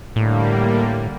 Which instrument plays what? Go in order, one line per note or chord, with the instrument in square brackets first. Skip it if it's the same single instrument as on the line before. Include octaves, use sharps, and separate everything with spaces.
[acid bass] A2 [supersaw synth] D3 G3 A#3